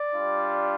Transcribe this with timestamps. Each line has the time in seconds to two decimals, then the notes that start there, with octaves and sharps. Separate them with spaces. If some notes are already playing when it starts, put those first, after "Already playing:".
Already playing: D5
0.14 G3 D4 F4